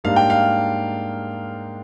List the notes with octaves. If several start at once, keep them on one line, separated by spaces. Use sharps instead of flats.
G#2 G3 A#3 D4 F5
G5
F5